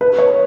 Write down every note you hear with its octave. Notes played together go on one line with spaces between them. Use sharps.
B4
C#5